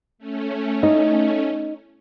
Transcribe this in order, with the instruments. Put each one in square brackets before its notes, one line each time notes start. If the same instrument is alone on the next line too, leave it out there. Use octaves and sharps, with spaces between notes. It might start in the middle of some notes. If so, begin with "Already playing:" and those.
[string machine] A3 C#4
[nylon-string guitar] D#4